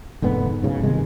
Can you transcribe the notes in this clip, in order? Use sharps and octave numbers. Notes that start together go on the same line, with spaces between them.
F1 G#2 D3 B3
B1 G#2 C#3
G1 C3 D#3 G#3